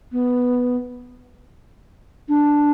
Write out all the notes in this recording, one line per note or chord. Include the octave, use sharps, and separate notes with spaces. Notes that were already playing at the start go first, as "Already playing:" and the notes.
B3
D4